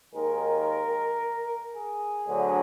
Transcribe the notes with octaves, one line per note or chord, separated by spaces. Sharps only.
D#2 D#3 G#3 A#4
G#4
D2 D3 F#3